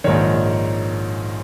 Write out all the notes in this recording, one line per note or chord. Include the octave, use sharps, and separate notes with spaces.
A#1 G#2 D#3 C#5